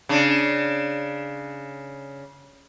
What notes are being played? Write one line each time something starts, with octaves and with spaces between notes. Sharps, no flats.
C#3 D4